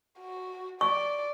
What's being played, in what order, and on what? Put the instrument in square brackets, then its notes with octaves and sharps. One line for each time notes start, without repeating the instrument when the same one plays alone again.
[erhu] F#4
[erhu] D5 [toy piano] C#6